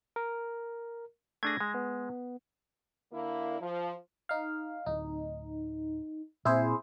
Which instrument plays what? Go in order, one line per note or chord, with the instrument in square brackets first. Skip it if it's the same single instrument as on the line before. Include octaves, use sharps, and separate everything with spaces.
[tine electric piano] A#4
[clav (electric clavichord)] A3 D4 G#4 [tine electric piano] G#6 A#6
[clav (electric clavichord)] G#3
[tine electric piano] B3
[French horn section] D3 A#3 E4
F3
[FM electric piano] D#4 F5
[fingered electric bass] D1 [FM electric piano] D#4
[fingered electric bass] A#2 C4 [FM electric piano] E4 G#4 C5